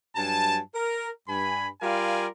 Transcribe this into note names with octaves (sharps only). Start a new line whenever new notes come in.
G2 F#3 G#5 A5
A#4
G2 G#5 B5
G3 F4 A#4 D5 F5 G#5